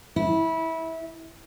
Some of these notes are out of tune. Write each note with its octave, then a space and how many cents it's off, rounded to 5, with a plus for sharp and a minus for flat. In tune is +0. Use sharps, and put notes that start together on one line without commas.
E4 -20